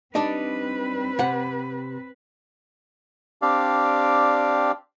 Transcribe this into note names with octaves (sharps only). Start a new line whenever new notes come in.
G3 C4 D4 D#4 B4
C3 F#5
C4 D4 G4 D5 F5